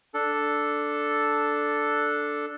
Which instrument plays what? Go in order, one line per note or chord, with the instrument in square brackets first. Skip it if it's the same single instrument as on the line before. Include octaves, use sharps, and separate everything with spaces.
[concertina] D4 A4